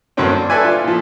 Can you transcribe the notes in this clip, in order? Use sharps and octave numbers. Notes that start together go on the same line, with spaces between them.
G2 D3 F#3 A#3 C4 C#4
D4
A4 B4 D5 E5 G#5
F4
A#2 F3